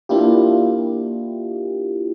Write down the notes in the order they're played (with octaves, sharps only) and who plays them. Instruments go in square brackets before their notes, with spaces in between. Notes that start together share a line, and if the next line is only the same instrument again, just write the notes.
[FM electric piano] A#3 D4 E4 F4 G4